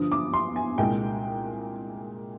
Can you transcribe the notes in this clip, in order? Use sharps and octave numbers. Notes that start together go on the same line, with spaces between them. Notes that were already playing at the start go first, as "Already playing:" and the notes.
Already playing: G2 D3 F3 D#6
D6
C6
G#5
C2 A#2 G#3 G5